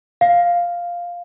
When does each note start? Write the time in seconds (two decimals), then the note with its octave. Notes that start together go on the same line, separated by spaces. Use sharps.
0.21 F5